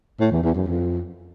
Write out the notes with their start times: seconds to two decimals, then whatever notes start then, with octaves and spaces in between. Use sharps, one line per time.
0.20 A2
0.32 E2
0.43 E2
0.55 F#2
0.67 F2